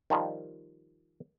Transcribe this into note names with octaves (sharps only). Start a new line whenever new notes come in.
D#3 F3 G3